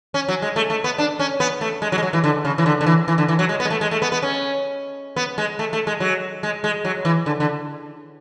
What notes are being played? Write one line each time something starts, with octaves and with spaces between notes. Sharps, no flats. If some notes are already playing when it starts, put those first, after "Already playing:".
C#4
F#3
G#3
A3
A3
B3
D4
C#4
B3
A3
G#3
F#3
G#3
F#3
E3
D3
C#3
E3
D3
D3
E3
E3
D3
E3
F#3
G#3
B3
G#3
A3
G#3
A3
B3
B3
C#4
B3
G#3
A3
A3
G#3
F#3
G#3
G#3
F#3
E3
D3
D3